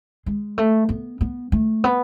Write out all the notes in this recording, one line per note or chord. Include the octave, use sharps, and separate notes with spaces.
G#3
A3
B3
B3
A3
B3